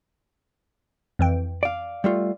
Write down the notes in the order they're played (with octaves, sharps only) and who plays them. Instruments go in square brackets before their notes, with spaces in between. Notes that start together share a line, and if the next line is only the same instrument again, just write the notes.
[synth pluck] F2 E3 G5
[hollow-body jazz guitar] D5 F5
G3 A3 F4